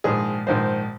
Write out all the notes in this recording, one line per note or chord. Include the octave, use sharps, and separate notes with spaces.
A#1 G#2 D#3 G#4
A#1 G#2 D#3 C5